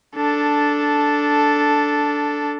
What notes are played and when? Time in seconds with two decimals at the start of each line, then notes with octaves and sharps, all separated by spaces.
0.16 D4 A4